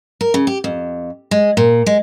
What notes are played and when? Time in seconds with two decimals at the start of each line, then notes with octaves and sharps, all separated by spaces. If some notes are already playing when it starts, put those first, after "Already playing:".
0.21 A#4
0.34 C#3
0.47 G4
0.64 F2
1.31 G#3
1.57 A#2
1.86 G#3